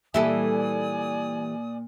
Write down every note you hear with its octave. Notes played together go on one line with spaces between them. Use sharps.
A#2 E3 G3 A4 D5 E5 G#5 D#6